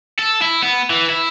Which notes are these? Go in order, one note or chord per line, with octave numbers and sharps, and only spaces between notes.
A4
E4
B3
E3
E4